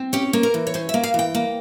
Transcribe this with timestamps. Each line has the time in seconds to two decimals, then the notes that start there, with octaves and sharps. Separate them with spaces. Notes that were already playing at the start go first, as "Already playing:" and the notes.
Already playing: C4
0.13 C#4 G4
0.33 A#3
0.43 A#4
0.54 E3
0.67 C#5
0.74 C#4 C5
0.89 E5
0.94 A#3
1.04 F5
1.14 E3 G5
1.35 A#3